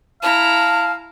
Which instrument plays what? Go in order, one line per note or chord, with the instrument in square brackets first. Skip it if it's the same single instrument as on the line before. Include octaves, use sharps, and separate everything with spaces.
[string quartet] E4 A#5 [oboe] F5 [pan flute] A5